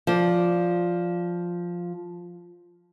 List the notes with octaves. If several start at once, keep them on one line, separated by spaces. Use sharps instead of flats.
F3 D5